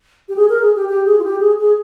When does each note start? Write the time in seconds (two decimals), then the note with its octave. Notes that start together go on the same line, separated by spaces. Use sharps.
0.29 G4
0.36 G#4
0.49 A#4
0.62 G#4
0.76 G4
0.89 G4
1.05 G#4
1.19 F4
1.24 G4
1.40 G#4
1.59 G#4